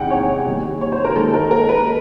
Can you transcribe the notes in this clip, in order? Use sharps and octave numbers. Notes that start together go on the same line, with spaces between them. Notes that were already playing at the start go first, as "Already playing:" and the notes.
Already playing: E2 C3 D#3 G#3 F#5 G5
C#5
D#2 D#3 G3
C#5
C5
A#4
D#2 D#3 G#3 A4
A#4
A#4
B4